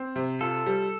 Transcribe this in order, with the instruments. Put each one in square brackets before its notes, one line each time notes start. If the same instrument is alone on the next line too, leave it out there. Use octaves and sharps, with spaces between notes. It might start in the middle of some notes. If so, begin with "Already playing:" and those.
Already playing: [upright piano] C4
C3
[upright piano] F4 [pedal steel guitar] A4
[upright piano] G3